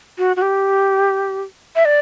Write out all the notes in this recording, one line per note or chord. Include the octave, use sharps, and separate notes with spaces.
F#4
F#4
G4
E5
D5